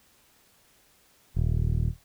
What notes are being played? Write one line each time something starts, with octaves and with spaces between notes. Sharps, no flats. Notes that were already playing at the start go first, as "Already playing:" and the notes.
D#1